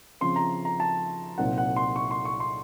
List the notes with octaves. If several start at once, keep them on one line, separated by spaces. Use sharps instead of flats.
C#3 F3 C4 C6
A#5
A#5
A5
C2 A#2 F#3 C4 D#4 F#5
F#5
C6
C#6
C6
C#6
C6